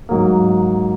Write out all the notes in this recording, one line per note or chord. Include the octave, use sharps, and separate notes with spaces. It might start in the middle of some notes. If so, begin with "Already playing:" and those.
G#2 F#3 A#3